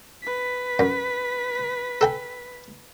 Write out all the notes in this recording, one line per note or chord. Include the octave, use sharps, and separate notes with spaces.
B4 B6
F#2
A4 G5 G#5